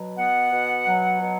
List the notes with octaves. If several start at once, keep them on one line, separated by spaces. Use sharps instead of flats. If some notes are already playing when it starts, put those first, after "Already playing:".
Already playing: B2 F#3
B3 F#5
B2
F#3
B2